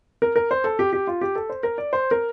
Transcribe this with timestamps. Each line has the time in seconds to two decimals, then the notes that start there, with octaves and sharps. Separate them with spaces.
0.22 A#4
0.36 A#4
0.51 C5
0.64 A4
0.79 G4
0.93 G4
1.07 F4
1.21 G4
1.35 A4
1.50 C5
1.63 A#4
1.78 D5
1.93 C5
2.11 A#4